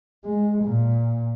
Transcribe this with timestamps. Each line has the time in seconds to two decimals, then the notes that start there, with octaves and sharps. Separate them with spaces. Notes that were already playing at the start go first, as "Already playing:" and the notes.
0.25 G#3
0.64 A#2